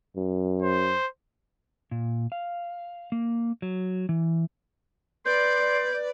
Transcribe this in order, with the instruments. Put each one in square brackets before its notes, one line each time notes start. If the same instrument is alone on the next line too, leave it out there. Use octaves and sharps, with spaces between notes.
[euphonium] F#2
[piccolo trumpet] C5
[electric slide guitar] A#2
F5
A#3
F#3
E3
[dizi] B4 [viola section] D5 [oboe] C6 [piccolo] G6